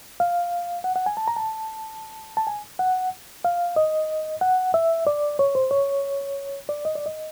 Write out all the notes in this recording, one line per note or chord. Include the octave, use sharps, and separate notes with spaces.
F5
F#5
F#5
G#5
A5
A#5
A5
A5
G#5
F#5
F5
D#5
F#5
E5
D5
C#5
C5
C#5
D5
D#5
D5
D#5